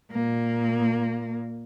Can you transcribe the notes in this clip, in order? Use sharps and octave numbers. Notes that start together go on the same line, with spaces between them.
A#2 A#3